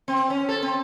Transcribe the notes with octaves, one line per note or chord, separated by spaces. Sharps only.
C4
C#4
A4
C4